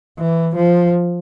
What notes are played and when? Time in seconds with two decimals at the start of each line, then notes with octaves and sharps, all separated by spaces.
0.19 E3
0.56 F3